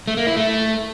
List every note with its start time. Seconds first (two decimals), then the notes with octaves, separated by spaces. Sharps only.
0.07 A3
0.17 A#3
0.27 E4
0.37 A3